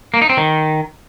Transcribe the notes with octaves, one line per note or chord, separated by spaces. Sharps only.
A#3
D#4
C4
D#3